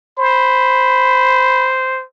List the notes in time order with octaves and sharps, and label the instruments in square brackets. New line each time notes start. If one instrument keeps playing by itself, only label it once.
[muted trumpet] C5 [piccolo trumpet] B5